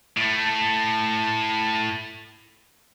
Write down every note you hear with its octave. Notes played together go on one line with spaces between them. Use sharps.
A2 A3